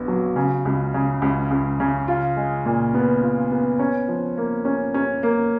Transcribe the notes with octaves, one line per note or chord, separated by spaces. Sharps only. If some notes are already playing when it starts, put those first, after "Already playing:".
Already playing: A#1 B3
F#3
C#3
C#2
C#3
C#2
C#2
C#3
F4
G#3
A#2
B3
F4
B3
C#4
F3
A#3
C#4
C#4
A#3